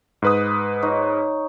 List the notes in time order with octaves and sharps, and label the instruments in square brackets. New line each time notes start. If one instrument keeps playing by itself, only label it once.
[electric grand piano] G#2 B4 D#6
[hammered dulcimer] D#4 C#5